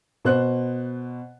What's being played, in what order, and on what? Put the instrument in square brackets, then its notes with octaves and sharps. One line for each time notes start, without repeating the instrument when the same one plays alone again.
[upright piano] B2 C5 F#6